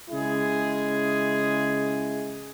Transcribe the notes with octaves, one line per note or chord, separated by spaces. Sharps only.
C#3 G#3 E4 G#4